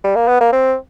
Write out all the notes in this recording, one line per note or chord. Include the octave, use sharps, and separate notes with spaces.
G3
A#3
B3
A#3
C4